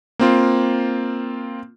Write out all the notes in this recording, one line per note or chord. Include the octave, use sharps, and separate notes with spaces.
A#3 C4 F4